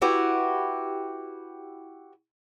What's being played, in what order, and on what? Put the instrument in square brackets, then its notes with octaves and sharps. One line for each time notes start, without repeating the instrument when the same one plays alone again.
[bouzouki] E4 F#4 G4 B4